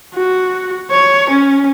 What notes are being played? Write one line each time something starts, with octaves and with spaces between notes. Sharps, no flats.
F#4
C#5
C#4